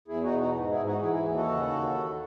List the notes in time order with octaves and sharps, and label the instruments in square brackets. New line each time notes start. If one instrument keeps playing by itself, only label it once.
[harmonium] E2 E4 G#4
D#4 F#4
B2
D#4 F#4
G#2
E4 G#4
G#2
D#4 F#4
E3 E4 G#4
E4 G#4
D#2
F#4 A4
C#3
D#2
D#3